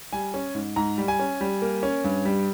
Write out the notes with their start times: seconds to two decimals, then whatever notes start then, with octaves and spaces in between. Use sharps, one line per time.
0.13 G3 G#5
0.34 C#4
0.55 G#2
0.76 G#2 A#5
0.98 G3
1.08 G#5
1.19 C#4
1.41 G3
1.62 A#3
1.83 C#4
2.04 G2
2.25 G3